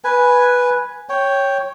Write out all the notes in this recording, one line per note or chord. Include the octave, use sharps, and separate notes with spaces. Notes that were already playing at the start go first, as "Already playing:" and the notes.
B4 G#5
C#5 G5